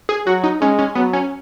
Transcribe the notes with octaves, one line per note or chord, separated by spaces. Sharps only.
G#4
F#3 F#4
D#4
G#3 C#4
C#4
F#3 B3
C#4